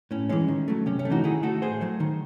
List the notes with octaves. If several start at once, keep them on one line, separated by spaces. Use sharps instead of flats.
A2 C#4
E3 G#3 C#4
D#3
F#3 A3
C3 C#4
C#4
A3
E3 D#4 F#4
D#3 E4 G#4
A3 F#4 A4
A2 G#4 C5
F#3 A3
D#3